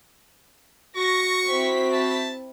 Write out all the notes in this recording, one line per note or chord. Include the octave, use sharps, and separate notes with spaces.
F#4 C#6 A#6
C4 E4 B6
A5